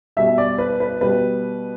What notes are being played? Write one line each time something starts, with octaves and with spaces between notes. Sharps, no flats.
B2 G3 E5
D5
B4
B4
B2 G3 B4